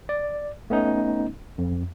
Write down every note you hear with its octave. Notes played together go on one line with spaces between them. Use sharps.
D5
A3 B3 C#4 D#4
F2